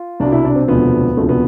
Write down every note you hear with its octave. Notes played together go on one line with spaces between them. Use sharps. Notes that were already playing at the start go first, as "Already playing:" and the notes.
Already playing: F4
C2 B2 D4
E4
D4
C4
E1 D2 C3 F3 B3
E1 D2 C3 F3 A3
B3